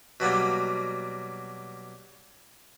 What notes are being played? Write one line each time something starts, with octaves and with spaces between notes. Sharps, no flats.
B2 F#3 G3 A#3